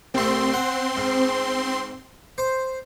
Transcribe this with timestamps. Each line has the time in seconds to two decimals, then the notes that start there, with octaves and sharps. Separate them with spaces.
0.14 C2 A3 C4 C6
0.54 F#5
0.97 G#2
2.38 C5